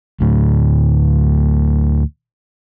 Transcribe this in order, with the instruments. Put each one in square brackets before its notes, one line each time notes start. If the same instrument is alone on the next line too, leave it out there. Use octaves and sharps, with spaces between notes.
[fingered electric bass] D2 A2